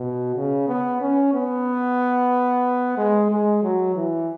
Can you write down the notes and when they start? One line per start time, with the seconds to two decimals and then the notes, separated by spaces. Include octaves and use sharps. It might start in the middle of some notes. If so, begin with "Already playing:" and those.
Already playing: B2
0.36 C#3
0.68 B3
1.01 C#4
1.34 B3
2.97 G#3
3.31 G#3
3.63 F#3
3.95 E3